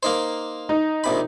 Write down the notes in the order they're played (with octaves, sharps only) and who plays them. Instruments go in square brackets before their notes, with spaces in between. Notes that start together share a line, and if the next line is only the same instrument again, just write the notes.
[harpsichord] A#3 D#4 C5
[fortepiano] D#4
[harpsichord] A#1 C3 B5